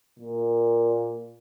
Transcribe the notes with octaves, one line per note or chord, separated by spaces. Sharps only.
A#2